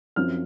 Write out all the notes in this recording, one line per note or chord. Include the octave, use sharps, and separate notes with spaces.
F#2 F3 C4 F6